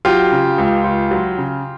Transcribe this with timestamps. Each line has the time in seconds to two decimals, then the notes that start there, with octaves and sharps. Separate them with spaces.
0.05 F#3 F4 G4
0.32 C#3
0.58 C#2
0.84 C#2
1.11 F#3
1.38 C#3